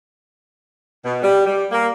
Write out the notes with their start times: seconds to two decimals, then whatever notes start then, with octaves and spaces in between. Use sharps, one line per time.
1.05 B2
1.23 G3
1.46 G3
1.72 A#3